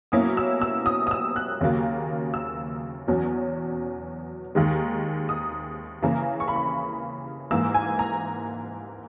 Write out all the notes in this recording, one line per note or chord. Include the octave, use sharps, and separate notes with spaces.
B2 F#3 A#3 C#4 E4 D#6
E6
E6
D#6
D#6
E6
F#6
D#2 C#3 F#3 A#3
E6
E2 B2 F#3 C#4
D#2 D#3 G#3
D#6
C#3 E3 A#3 A#5
C#6
B5
C#6
G#2 E3 A#3 E6
G#5
A#5